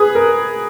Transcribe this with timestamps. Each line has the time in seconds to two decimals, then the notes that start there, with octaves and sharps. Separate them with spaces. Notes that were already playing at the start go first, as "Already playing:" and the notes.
Already playing: G#4 B4
0.15 A#4